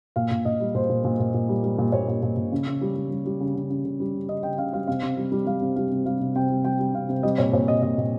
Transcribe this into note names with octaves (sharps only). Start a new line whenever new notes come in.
A#2 F5
A#2
A#2 D#5
G3
A#2 C5
A#2
A#2
A#2
A#2
G3
G3
A#2
A#2 C#5
A#2
A#2
A#2
C#3
C#3
G3
G3
G3
G3
C#3
C#3
C#3
C#3
G3
C#3
C#3 D#5
C#3 G5
C#3 F5
G3 F5
C3 F5
C3
G3
G3
G3 F5
C3
G3 F5
C3
G3 F5
C3
C3 G5
G3
G3 G5
G3
C3 F5
C3
G3 D#5
A#2 C#5
A#2 C#5
A#2 D#5
A#2 D#5
A#2